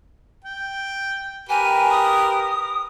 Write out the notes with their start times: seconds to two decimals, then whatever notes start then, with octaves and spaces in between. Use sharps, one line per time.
0.44 G5
1.49 G4 A#4 B4 G#5
1.91 D#6